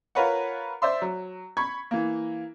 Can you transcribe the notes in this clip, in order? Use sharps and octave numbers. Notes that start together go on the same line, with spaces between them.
F4 A#4 B4 C#5 F#5
C5 D5 E5 C6
F#3
B5 C#6 G#6
E3 A#3